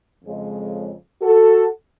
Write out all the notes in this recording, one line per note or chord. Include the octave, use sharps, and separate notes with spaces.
F2 C#3 G#3
F#4 A4